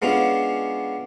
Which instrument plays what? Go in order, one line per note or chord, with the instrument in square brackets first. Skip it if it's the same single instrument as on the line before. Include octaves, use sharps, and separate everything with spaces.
[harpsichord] G#3 B3 C#4 D4 F4